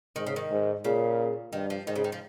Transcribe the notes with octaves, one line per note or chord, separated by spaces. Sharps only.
G#2 D#3
C#3
D#3
G#2
A#2 C#3
G2 D#3
F3
G#2 D#3
C#3
D#3
F3